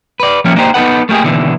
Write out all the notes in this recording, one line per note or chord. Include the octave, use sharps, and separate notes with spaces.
B4 D5
F3 G3 A3 A#3 C#4
A#3 D4 D#4 G4 A#4 C5
B3 D#4 A4 B4 F#5
A3 A#3 G4 G#4
D#2 B2 D3 E3